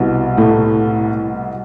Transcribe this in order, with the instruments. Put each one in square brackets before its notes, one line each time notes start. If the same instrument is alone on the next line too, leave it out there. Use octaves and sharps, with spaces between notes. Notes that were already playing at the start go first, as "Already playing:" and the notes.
Already playing: [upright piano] C2 B2
A2 A3